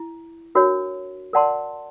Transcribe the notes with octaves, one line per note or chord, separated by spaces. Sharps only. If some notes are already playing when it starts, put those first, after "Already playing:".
Already playing: E4
D4 F#4 A#4 C#5
A#4 D5 F#5 A5 C6